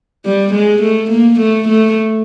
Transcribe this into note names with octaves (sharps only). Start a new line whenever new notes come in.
G3
G#3
A3
A#3
A3
A3